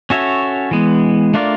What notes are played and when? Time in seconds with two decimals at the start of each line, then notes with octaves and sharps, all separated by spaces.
0.10 C#4 F#4 A4 C#5 E5
0.71 E3 G#3 B3
1.34 A3 D4 F4 A#4 D5